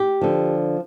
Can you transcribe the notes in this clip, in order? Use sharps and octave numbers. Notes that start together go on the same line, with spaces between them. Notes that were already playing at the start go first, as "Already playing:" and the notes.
Already playing: G4
D3 F3